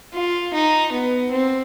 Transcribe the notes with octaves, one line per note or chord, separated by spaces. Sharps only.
F4
D#4
B3
C4